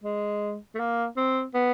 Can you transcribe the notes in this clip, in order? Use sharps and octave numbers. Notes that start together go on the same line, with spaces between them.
G#3
A3
A#3
C4
B3